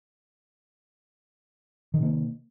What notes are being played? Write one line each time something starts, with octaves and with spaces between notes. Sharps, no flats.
C3 D#3 A#3